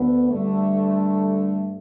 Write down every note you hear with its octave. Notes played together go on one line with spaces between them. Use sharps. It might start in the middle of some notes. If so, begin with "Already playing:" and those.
Already playing: D2 D3 B3
G2 D3 A3